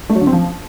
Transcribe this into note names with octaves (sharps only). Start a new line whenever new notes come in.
A3
F#3
D3
C4
F3